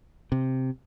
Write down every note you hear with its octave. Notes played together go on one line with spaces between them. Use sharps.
C3